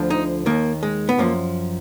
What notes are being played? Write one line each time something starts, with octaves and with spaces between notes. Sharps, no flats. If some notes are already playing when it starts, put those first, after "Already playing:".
Already playing: D2 D3 F3
D#4
D#2 D#3 A#3
G#3
B3
F#2 F3 A#3